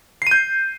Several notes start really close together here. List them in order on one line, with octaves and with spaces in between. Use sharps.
C7 D#7 G6